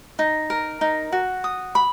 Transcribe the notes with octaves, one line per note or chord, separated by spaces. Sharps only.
D#4
A#4
D#4
F#4
D#6
B5